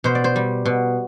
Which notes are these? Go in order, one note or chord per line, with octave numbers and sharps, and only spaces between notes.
B2 C5
D5
C5
G3
B2